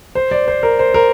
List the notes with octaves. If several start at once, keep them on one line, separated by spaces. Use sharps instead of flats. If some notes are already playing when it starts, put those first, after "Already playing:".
C5
D5
C5
A#4
C5
A#4